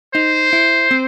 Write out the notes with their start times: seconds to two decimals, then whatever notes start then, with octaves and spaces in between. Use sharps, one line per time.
0.14 D#4 C5
0.53 E4
0.91 C4